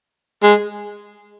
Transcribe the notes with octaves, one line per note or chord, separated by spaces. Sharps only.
G#3